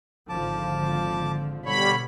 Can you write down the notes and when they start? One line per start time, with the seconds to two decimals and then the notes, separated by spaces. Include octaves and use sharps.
0.29 G#1 D3 F3 A5 D6
1.66 B2 D3 G3 C#5 B5